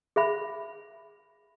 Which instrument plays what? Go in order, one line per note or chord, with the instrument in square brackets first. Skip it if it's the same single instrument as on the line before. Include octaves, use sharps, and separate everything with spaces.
[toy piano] G#4 E5 B5